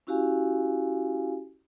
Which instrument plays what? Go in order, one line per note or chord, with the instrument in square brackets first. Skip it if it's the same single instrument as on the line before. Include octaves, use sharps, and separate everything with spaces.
[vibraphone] C#4 E4 F#4 G4 F5 G#5